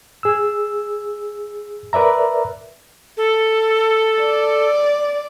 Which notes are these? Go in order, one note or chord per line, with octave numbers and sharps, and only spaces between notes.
G#4 E6
A#4 B4 D5 E5 A#5
A4
D5